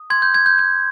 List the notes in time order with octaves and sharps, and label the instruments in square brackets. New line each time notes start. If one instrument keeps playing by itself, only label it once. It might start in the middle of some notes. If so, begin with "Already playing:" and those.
Already playing: [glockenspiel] D#6
C6 G#6
G6
G6 G#6
G6
G6 G#6